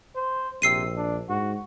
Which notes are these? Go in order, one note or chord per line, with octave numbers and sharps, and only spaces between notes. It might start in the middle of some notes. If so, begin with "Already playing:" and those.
C5
A#1 C3 E6 C7 D#7
D4
G#2 F#4